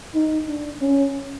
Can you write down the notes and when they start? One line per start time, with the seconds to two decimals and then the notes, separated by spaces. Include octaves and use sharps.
0.15 D#4
0.48 D4
0.81 C#4